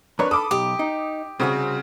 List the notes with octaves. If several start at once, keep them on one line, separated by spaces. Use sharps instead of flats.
F2 D4 A#4 B4 C#5
A4 B5 D6 D#6
B1 G4 D#6
D#4
C2 C#3 C4 F#4 G#4